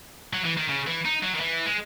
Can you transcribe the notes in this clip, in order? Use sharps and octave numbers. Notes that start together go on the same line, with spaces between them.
F#3
E3
D#3
C#3
E3
D#4
F#3
D#3
E3
G#3